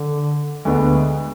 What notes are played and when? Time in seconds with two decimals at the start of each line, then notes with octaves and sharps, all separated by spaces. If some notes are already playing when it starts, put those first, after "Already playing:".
Already playing: D3
0.65 D2 D3 G#3 B3 D4